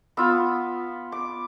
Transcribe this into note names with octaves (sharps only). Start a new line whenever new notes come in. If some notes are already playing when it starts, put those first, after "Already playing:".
B3 F4 E6
D6